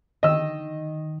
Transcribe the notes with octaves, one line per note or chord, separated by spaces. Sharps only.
D#3 D#5 E6